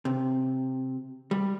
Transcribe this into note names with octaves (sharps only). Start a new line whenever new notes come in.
C3
G3